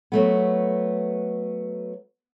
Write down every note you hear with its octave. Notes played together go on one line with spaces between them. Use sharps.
F#3 A3 B3